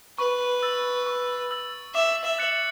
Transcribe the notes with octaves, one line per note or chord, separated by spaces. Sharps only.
B4 C#6
E6 A6
C#6
E6 A6
E5 D6
E5
F#6 A6 C#7 F#7